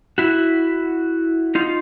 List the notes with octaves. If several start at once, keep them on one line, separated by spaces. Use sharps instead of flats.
E4 F#4
D#4 F4